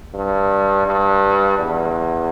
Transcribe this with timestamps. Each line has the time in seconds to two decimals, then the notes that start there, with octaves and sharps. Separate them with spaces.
0.14 G2
0.86 G2
1.59 E2